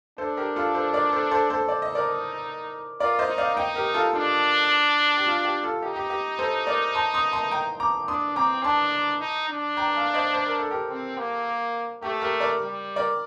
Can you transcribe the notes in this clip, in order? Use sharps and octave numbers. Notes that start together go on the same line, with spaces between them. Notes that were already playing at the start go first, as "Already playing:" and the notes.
D4 A4 C5
G4 A#4
F4 A4
A4 C5
A#4 D5
A4 C5
A4 C5
A4 C5
D5
D#5
D#4
A#4 D5
F4 A#4 D5
C5 D#5
D#4
D5 F5
D#4 D#5 G5
G4 A#4
F4 A4
D4 F4
G4
F4
G4
F4 A4
D#4 G4
G4
G4
A4 C5
A#4 D5
A5 C6
C6 D#6
A5 C6
G5 A#5
A#5 D6
D4 C6 D#6
C4 A#5 D6
D4 A5 C6
D#4
D4
G5 A#5
F5 A5
C5 D#5
C5
A#4
A4
G4 A#4
C4
A#3
A3 G4
G4 A#4
A#4 D5
G3
A#4 D5